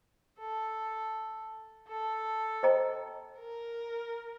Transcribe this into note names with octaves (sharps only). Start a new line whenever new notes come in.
A4
A4
C5 D#5 G5 A#5
A#4